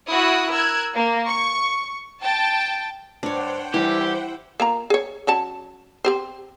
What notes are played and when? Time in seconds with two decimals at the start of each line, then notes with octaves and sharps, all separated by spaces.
0.10 E4 F#4 E5 D#6 F#6
0.51 A#4 E6 F#6 G#6
0.94 A#3
1.28 C#6
2.21 G5 A5 A6
3.23 G2 D4 C5 C#5 F#5 G5
3.74 E3 G3 E4 G4
4.60 A#3 F4 A#5
4.90 G#4 C#5
5.27 F#3 C#4 A5
6.05 C4 G4 C5